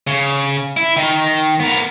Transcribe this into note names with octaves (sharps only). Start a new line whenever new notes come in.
C#3
E4
D#3 D#4
B3 A#4